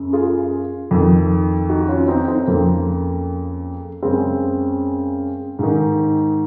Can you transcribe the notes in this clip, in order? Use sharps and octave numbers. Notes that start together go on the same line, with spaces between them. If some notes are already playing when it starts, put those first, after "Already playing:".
Already playing: F#2 C#3
F4 G#4
F2 D#3
D#4 F#4
C#4 F4
C4 D#4
C4 D#4
F2 C#3 A#3
F#2 C#3 G#3 C4
G#2 D#3